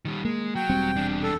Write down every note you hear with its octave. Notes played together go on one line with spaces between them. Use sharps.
D#3 G3
G#3 A#3
F#3 G5
E1 G3 C4
E2 D4
A4